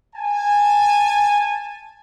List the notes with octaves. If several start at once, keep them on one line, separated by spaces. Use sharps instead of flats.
G#5 A5